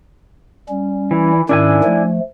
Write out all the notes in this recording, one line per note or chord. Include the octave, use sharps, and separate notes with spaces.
G3 C#4
E3
G#2 D#3 C#4 D4 E4 G#5
F3 A3